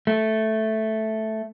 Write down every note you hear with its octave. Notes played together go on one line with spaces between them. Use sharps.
A3